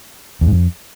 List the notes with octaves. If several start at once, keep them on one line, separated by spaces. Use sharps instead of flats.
E2
G#2
F2